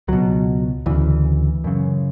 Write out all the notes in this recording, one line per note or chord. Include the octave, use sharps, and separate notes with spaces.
C#2 B2 F#3
D2 C#3 E3
F#2 C#3